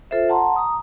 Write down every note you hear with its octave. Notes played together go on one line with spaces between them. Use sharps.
F4 A4 C5 E5
F#5 A5 A#5 C6
A#5 D#6